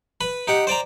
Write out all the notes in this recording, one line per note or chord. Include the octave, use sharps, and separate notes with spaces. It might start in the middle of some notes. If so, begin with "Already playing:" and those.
B4 B5
D#4 G4 F#5
C5 D5 G5 A#5